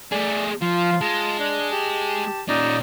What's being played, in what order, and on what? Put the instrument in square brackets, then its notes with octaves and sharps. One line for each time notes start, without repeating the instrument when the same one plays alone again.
[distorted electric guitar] A3 G#4 [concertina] D5
[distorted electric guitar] F3 [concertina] F4 F5
[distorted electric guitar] G#3 [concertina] F4 A5
[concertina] D4
G4 A5
[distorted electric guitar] A#2 C#4 [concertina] D#4 D5 D#5